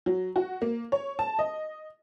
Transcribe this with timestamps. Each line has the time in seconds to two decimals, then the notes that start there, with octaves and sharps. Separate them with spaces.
0.06 F#3
0.36 F#4
0.62 A#3
0.92 C#5
1.19 A5
1.39 D#5